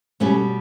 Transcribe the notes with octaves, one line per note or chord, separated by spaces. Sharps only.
B2 G3 A3 C#4